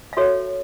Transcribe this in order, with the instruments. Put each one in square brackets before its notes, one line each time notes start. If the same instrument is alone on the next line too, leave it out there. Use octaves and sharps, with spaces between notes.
[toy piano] F5
F#4 A4 C#5 E5